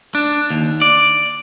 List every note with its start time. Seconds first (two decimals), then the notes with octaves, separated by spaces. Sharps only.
0.15 D4
0.50 D#2
0.82 D5